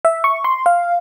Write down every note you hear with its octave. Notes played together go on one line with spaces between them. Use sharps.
E5
C#6
C6
F5